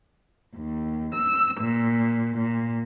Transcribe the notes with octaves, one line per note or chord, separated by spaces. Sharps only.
D#2
E6
A#2
A#2